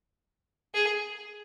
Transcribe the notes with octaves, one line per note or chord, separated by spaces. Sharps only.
G#4